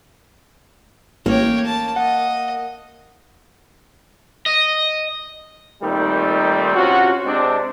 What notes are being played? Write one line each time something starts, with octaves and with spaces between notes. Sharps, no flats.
A1 A#3 C#5 G5
A5
D#5 F#5
D#5
A#2 D#3 G3 A3 C4 D#4
C3 C#4 F4 F#4
C3 G#3 C4 D4